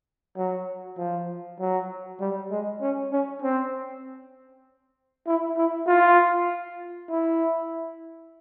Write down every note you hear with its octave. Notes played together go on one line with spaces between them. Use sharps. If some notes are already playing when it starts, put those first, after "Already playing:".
F#3
F3
F#3
G3
G#3
C#4
C#4
C4
E4
E4
F4
E4